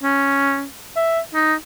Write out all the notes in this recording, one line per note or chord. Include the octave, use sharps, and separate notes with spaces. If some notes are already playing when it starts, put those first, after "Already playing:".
C#4
E5
D#4